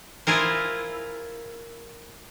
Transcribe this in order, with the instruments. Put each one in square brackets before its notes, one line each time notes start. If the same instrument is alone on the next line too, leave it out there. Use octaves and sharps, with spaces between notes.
[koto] E4 F4 G#4 A#4 C5